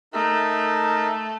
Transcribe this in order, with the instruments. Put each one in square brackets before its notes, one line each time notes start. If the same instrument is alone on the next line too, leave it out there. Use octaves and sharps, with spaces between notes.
[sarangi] A3 [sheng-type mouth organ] D#4 A#4 E5